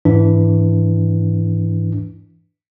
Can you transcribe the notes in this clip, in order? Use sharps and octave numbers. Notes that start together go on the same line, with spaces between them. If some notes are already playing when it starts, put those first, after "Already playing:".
G#2 E3 D4